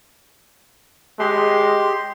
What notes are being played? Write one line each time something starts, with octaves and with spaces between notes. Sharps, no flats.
G#3 G4 C6